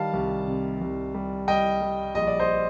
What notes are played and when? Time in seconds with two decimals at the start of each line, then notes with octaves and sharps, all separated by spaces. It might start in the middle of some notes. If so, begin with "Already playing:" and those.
Already playing: D#3 G3 F5 A5
0.13 C2
0.47 C3
0.81 C2
1.14 G3
1.48 G3 D#5 G5
1.82 G3
2.15 A#1 D#5
2.27 D5
2.40 C5 D#5